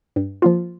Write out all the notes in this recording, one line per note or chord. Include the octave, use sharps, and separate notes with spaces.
G2
F3 A#3 F4